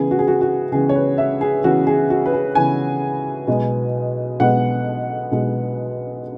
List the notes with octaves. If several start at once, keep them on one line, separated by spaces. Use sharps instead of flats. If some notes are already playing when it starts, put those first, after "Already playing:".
Already playing: C#2 C#3 E3 B3 G#4
F#4
G#4
F#4
F#4
C#2 C#3 E3 B3 G#4
C#5
B4
E5
G#4
C#2 C#3 E3 B3 F#4
G#4
F#4
B4
G#4
C#2 C#3 E3 B3 G#5
B1 B2 G#3 B3
B1 B2 G#3 B3 F#5
B1 B2 G#3 B3